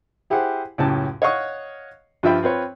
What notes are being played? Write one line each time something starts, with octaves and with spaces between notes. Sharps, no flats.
E4 G4 G#4 C5 F#5
C#2 F#2 A2 C#4 G4 A5
C#5 D#5 F5 F#5 C#6 D#6
G2 F3 F4 E5 G5 B5
C4 F4 B4 C#5